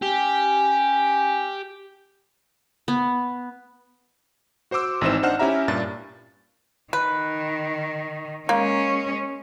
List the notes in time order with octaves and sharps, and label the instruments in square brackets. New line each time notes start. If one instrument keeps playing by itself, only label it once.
[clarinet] C#4 [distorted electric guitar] G4
[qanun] B3
[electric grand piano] F#4 C5 C6 D6 E6
G#1 E3 C4 D#4 C5 E7
D4 D#4 C5 F#5 F6 E7
C#4 E4 G4 E5 A#5
G2 A#2 D4 A6
[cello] D#3 [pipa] B4
[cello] G#3 C#4 [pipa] A#3